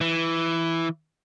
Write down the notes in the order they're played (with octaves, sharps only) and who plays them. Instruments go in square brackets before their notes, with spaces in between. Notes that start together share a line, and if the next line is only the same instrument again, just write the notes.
[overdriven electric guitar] E3